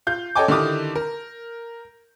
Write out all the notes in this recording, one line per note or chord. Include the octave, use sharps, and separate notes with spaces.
F4 G6
A4 C#5 D#5 G5 G#5 D6
D3 D#3 E4 G4 D6 D#6
A#4